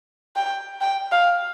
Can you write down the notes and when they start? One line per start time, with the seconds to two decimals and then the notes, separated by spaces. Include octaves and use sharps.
0.36 G5
0.81 G5
1.12 F5